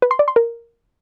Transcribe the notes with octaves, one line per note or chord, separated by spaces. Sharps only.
B4
C6
D5
C6
A#4